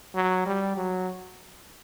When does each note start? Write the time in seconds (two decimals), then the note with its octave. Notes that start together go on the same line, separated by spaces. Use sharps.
0.15 F#3
0.46 G3
0.77 F#3